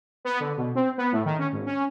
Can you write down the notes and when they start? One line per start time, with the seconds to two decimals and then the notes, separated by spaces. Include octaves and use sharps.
0.25 B3
0.40 D3
0.57 B2
0.75 C4
0.98 B3
1.12 A2
1.25 D#3
1.39 C#4
1.52 G#1
1.66 C#4